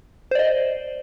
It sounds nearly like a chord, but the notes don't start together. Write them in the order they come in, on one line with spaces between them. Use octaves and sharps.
C5 D5 D#5